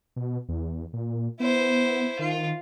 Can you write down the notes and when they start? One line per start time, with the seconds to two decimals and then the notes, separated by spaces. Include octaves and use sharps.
0.16 B2
0.49 E2
0.93 A#2
1.40 B3 E4 C5
2.19 D#3 F4